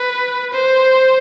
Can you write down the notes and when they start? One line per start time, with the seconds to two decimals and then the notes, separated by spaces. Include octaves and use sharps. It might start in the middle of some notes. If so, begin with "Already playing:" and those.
Already playing: B4
0.53 C5